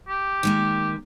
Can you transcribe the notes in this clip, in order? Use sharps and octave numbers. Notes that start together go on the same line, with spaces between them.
G4
D#3 G#3 A#3